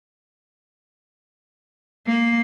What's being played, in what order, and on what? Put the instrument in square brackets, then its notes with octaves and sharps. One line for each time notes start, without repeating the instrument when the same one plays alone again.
[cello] A#3